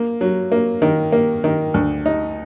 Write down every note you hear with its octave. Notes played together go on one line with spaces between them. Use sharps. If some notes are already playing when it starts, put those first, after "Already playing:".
Already playing: A#3
F#3
A#3
D#3
A#3
D#3
D2
D#4